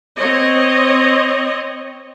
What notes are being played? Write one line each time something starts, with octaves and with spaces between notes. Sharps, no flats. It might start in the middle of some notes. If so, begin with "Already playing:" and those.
C4 C#5 D#5